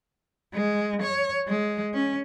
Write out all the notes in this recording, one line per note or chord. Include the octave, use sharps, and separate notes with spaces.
G#3
C#5
G#3
C#4